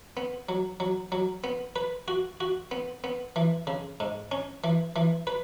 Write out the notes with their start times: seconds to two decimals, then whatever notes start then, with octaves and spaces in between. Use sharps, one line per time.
0.17 B3
0.49 F#3
0.80 F#3
1.12 F#3
1.44 B3
1.76 B4
2.08 F#4
2.40 F#4
2.71 B3
3.04 B3
3.36 E3
3.67 C#3
4.00 G#2
4.31 C#4
4.64 E3
4.96 E3
5.27 B4